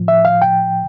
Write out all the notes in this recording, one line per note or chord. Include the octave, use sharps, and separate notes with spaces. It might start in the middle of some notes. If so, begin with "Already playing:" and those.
Already playing: A2 F3
E5
F5
G5